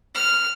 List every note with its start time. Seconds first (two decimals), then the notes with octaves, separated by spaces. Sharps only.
0.15 F6